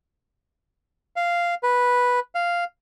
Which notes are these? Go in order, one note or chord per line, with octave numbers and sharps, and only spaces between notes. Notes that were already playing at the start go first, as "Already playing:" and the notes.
F5
B4
F5